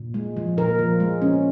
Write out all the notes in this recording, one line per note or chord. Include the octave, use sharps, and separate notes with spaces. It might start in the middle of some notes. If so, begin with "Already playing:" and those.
Already playing: A#2
G#3
F3
A#2 A#4
F3
G#3
C#4